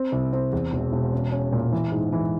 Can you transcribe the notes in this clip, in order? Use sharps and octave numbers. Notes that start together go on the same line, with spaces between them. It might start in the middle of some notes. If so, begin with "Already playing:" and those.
Already playing: C4
C2
C4
E2
E1
E1
C#4
C#4
A#2
E3
G#2
E3